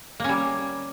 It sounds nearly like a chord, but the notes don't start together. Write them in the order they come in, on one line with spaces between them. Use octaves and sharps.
A#3 C#4 G3